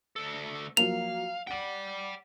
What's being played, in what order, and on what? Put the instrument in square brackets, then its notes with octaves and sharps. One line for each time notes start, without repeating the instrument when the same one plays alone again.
[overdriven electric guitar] D2 A4
[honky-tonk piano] F3 F#3 A#3 [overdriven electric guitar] F5 [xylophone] F7
[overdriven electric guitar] D5 G5 [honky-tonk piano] F#5 F#7